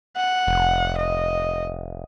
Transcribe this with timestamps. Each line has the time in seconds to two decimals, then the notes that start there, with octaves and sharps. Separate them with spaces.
0.16 F#5
0.48 F1
0.97 D#5